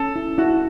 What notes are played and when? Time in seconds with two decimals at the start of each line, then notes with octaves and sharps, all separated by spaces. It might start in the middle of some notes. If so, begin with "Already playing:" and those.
Already playing: C#4 A4
0.16 E4
0.38 E4 F#4